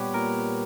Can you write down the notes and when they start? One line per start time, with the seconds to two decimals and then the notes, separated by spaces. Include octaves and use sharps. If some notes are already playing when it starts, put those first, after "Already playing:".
Already playing: A#2 G3 B3 G4 B4 C#5
0.14 A#2 A#4